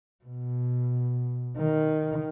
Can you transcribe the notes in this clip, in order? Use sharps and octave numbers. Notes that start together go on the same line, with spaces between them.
B2
D#3